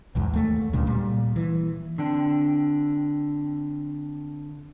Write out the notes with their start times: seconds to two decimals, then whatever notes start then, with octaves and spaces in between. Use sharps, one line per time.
0.15 B1 E2 G#2
0.33 D#2 A3
0.73 C#2 G2 A#2 C#3
0.87 A#2 G3
1.36 E3
1.98 D3 C4 D4 G5